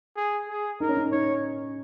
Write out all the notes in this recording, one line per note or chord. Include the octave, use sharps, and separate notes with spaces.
G#4
G#4
D#4 A#4
C#4
D#4
D#4 C#5